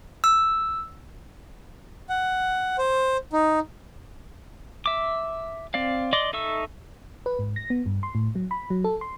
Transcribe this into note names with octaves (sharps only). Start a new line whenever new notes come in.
E6
F#5
C5
D#4
E5 D6
C4 D5 F5
D5 D#5 C6 D6
D#4 A4 E5 C#6 E6
B4
G#2
A#6
B3
G2
C6
A2
F#3
B5
F#3
A4
C6